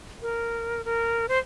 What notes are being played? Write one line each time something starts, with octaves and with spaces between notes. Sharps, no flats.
A#4
A#4
C5